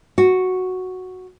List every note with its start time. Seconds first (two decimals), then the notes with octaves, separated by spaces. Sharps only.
0.18 F#4